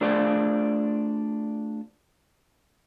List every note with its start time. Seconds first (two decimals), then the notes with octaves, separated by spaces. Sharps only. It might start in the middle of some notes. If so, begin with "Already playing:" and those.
0.01 A3 D4 F4 G#4 C5 D5